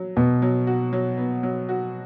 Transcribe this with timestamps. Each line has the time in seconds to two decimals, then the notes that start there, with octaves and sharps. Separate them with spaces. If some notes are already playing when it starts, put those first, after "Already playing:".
Already playing: F#3
0.16 B2 B3
0.42 F#3
0.67 F#4
0.93 F#3
1.18 B3
1.43 F#3
1.69 F#4